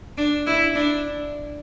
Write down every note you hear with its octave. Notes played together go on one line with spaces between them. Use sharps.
D4
E4
D4